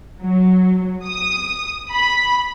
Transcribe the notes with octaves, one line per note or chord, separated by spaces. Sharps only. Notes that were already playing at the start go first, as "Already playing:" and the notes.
F#3
D#6
B5